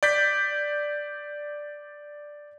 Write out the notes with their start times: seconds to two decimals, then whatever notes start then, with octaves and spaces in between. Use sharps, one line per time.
0.03 D5 G6 B6